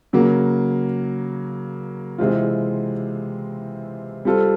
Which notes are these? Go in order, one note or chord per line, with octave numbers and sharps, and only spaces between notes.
C#3 F#3 A#3
C3 E3 G#3 C4 F4
G3 C4 F4 A4